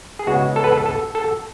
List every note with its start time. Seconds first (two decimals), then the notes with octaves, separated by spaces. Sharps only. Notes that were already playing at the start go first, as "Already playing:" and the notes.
0.19 G#4
0.27 C#3 G#3 B3 E4 F#4
0.56 A4
0.64 B4
0.72 A4
0.86 A4
1.15 A4